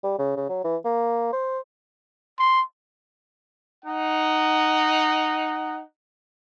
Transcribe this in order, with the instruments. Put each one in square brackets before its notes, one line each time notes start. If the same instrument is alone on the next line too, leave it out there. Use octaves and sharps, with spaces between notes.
[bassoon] G3
C#3
C#3
F#3
E3
A#3
C5
[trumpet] C6
[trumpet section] D#4 F#5